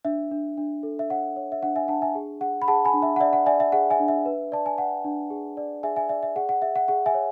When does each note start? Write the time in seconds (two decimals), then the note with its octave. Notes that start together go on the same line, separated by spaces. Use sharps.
0.05 D4 E5
0.31 D4
0.57 D4
0.83 A4
0.99 E5
1.10 C#5 F#5
1.36 C#5
1.52 E5
1.63 D4 F#5
1.76 E5 G#5
1.88 D4 F#5 A5
2.02 E5 G#5
2.15 G#4
2.41 G#4 F#5
2.62 B5
2.68 G#4 F#5 A5
2.85 G#5 B5
2.94 D4
3.02 E5
3.16 F#5
3.20 D5 E5
3.33 F#5
3.46 D5 E5 G#5
3.60 E5
3.72 G#4 F#5
3.90 E5 G#5
4.00 D4
4.08 E5
4.25 B4
4.52 D5 A5
4.66 G#5
4.78 D5 F#5
5.04 D4
5.30 G#4
5.57 D5
5.83 G#4 E5 G#5
5.96 E5 G#5
6.09 D5 E5
6.23 E5
6.36 G#4 F#5
6.49 F#5
6.62 G#4 E5
6.76 F#5
6.88 G#4 F#5
7.06 E5 G#5
7.14 C#5